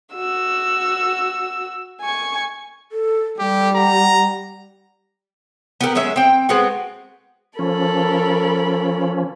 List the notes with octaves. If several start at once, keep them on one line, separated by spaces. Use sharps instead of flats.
F#4 E6
G#5 C#6
A4
G3 G4 A4
F#5 A#5
B3 G4 A4 A#4
F#3 G#3 C#4 E5
C4 G5
G#3 B3 C4 F#4
F3 C#4 A4 A#4 B5